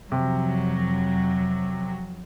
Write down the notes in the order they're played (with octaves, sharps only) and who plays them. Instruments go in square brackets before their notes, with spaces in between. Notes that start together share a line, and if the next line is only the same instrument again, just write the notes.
[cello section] F2 F#3 [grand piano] C3